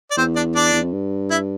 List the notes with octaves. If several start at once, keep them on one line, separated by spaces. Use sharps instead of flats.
D5
E2 C4 C5
D4 D5
D4 D5
E2
F2
G2
E4 E5